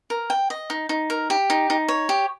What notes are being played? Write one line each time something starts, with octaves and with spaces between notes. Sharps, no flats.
A#4
G5
D#5
D#4
D#4
A#4
G4
D#4
D#4
C#5
G4